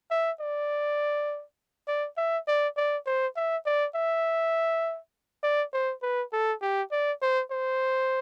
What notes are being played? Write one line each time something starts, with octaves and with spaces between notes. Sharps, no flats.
E5
D5
D5
E5
D5
D5
C5
E5
D5
E5
D5
C5
B4
A4
G4
D5
C5
C5